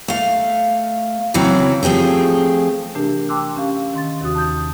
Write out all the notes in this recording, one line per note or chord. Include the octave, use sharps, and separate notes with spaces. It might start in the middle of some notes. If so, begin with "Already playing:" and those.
A3 F5
C#3 E3 F#3 C4 E4
F3 A3 C4 G4 G#4
C3 E3 A3 D4 G4 A#4
G5 A5 C6 D6 E6 F#6
C#4 G4 F5
D#3 C6 A6
D#2 C3 F#4 D#6
A5 D#6 G6